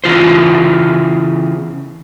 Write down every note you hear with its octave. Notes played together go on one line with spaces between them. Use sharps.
C#3 E3 F4 C5